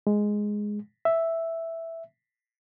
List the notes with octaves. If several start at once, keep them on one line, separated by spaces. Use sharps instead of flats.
G#3
E5